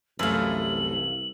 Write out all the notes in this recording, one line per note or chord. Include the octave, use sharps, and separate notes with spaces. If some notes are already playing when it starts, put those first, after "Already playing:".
C2 F#2 E3 A3 F5 F#7